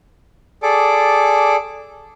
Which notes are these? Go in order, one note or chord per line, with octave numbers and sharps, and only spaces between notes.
G#4 A4 D5 D6